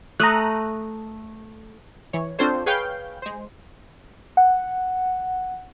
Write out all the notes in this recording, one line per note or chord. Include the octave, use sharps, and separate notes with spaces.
A3 A#5 D#6 F#6
E3 C#5
C4 D4 F4 A4 C5 C#5
G#4 B4 C#5 F5 G5 G6
G#3 C5
F#5